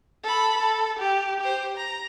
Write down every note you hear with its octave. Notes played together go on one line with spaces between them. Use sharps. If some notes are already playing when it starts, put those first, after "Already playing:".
A4 B5
A4
G4
G4 C5
A#5